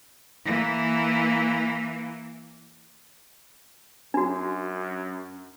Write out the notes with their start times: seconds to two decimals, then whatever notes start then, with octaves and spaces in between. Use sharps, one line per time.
0.45 E3 A#3
4.14 F#2 D4 F#4